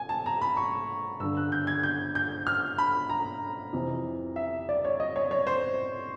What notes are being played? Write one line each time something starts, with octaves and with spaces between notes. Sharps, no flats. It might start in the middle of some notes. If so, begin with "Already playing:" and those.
Already playing: G#5
A5
A#5
B5
C#6
G2 D3 E6
F#6
G6
G#6
G6
G6
F6
B5
A#5
F2 C3 E3
E5
D5
C#5
D#5
C#5
C#5
C5